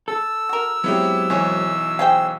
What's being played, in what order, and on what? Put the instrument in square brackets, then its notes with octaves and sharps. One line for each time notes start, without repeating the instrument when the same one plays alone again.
[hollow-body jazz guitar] A4 [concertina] E6
[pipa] F#4 A#4
[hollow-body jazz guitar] F#3 G#3 C4 [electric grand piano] B3 E4 G4
[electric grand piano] B1 E3 [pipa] G#4 C#5
[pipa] G#4 C5 G5 [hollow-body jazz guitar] F5